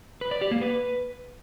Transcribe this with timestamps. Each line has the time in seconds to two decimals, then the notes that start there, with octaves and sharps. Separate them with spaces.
0.21 B4
0.31 D5
0.41 G4
0.51 A#3
0.61 B4